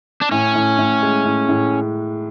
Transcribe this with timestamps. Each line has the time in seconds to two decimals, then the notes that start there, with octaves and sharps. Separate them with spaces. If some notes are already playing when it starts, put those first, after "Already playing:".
0.21 D4
0.31 A2 C#4
0.55 A2
0.79 A2
1.02 G#3
1.25 A2
1.49 A2